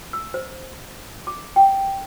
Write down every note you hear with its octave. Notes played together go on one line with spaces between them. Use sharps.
E6
C5
D6
G5